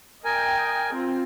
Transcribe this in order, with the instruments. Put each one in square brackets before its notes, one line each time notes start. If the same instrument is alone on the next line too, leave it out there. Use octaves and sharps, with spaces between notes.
[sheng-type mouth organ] A#4 G#5 [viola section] D#5 G5
[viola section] C4 F4